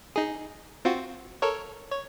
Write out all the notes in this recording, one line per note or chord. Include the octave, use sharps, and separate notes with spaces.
D#4 G#4
C4 F4 F#4
A4 A#4 C#5
C#5